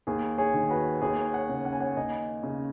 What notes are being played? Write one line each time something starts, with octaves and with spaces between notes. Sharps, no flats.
D#2 G#4
G#4 C#5
D#3
F#4 B4
D#2 G#4 C#5
C#5 F#5
C#3
F#5
G#5
C#5 F#5
D#2 D#5 G#5
C#3